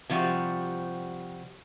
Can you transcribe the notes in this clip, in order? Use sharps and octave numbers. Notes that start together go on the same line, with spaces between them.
C3 F3 G3 F#4